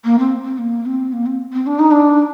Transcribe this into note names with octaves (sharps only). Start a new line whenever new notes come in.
A#3
C4
C4
A#3
C4
A#3
C4
C4
D4
D#4
D4